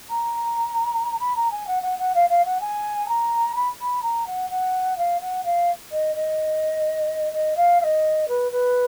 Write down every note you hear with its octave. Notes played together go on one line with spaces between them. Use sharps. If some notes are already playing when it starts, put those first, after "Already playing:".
A#5
B5
A#5
G#5
F#5
F#5
F#5
F5
F5
F#5
G#5
A#5
B5
B5
A#5
F#5
F#5
F5
F#5
F5
D#5
D#5
D#5
F5
F5
D#5
B4
B4